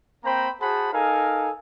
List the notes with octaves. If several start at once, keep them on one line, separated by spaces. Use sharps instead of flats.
A#3 C4 C5 G5 A#5 B5
F#4 G#4 C5 F#5 A5 B5
D#4 A4 A#4 F5 G#5